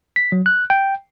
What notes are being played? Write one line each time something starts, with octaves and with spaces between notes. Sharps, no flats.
B6
F#3
F#6
G5